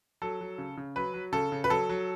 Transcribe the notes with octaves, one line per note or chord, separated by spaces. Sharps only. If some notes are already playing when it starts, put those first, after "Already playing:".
F#3 A4
F#3
C#3
C#3
F#3 B4
F#3
C#3 A4
C#3
B4
F#3 A4
F#3